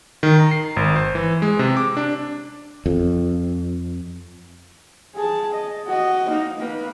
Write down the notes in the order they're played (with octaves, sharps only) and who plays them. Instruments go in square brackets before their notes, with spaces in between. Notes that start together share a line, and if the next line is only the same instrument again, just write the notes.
[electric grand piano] D#3
A#5
C7
G#1
C5
E3
G#3
C3
D6
D4
[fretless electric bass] F2
[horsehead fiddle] G#4 A5
D#5
F#4 D#5
A#3 D#4
A#3 B4